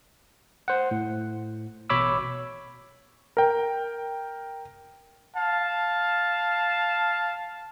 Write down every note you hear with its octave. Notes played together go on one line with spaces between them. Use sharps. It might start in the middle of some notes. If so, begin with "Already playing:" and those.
C5 F#5
A2
A1 B2 C#5 B5 D6 E6
A#4 G5
F5 A5